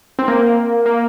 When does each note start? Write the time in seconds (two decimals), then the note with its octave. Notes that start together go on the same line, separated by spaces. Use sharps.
0.19 C4
0.28 A#3
0.86 A#3